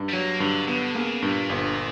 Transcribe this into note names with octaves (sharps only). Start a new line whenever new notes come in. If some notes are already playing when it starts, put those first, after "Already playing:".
Already playing: G2
G3
F#3 A#3
G2 D3
D3 B3
C#3 A#3
G2 A#2
G1